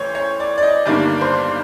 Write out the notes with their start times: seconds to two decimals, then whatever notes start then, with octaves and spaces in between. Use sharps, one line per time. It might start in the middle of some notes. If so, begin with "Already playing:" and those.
Already playing: A1 A2 E3 C5 C#5
0.15 C#5
0.40 D5
0.58 D5
0.63 D#5
0.86 G1 G2 D#3 G3 A#3 D5
1.21 C5